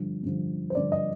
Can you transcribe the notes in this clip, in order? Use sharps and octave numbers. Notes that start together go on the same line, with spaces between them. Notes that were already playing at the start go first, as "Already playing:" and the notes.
Already playing: G2 D3 F3
G2 D3 F3
C5
G2 D3 F3 D5
D#5